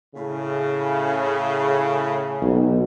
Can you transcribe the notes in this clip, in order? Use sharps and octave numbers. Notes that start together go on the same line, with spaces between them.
A2 C#3
B1